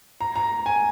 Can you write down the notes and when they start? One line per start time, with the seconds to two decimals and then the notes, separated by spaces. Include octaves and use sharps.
0.21 A#5
0.36 A#5
0.66 G#5